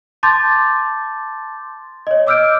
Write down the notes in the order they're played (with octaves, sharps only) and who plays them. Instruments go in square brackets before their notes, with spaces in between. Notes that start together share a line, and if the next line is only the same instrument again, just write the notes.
[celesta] A5 C6 D6 G6 A6
C#5 D#5
D#5 D6 E6 F6 G6 D7